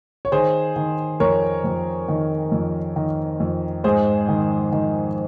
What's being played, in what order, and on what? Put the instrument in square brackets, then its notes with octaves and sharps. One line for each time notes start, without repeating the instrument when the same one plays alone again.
[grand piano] C#5
D#3 G#4 C5
D#3
F2 A#4 C#5
F2
D#3
F2
D#3
F2
G#2 G#4 C5
D#3
D#3